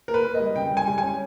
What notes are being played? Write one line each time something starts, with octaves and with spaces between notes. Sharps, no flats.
A#3 A#4
B4
A#3
G3 D#5
C#3 G5
G3
G#5
G3
C#4 G#5